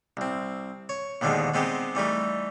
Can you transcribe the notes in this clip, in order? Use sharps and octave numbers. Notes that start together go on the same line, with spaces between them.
C2 C4
C#5
D#2 B2 D3 D#3 F3 G#3
G#3 B3 C4 D#4 G4
E3 G3 A3 D#4